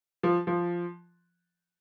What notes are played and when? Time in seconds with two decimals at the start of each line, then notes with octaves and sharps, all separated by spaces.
0.23 F3
0.47 F3